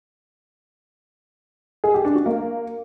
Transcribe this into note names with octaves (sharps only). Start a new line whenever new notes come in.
G#4
G4
D4
F#4
A#3